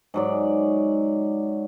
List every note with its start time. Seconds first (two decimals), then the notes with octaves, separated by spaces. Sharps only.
0.14 G#2 F#3 D5